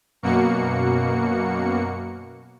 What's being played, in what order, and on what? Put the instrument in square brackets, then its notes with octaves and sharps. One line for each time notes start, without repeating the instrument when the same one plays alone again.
[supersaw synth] F#2 B2 A#3 F#4 C#7